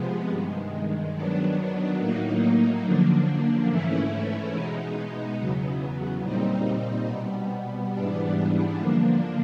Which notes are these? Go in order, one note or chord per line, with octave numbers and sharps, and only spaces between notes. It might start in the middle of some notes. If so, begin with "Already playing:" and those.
Already playing: C3 F3 G#3 B3
G2 D#3 G#3
D#3 F#3 B3 D4
A2 F#3 A#3 D#4
F#2 D3 F3 A#3 D4
G#2 E3 A3 C#4 E4
B2 G#3 B3 D#4
E2 C#3 F#3 B3
A#2 G3 C4 D#4
B2 G3 B3
G#2 E3 G3 B3 D4
D3 F3 A#3 D4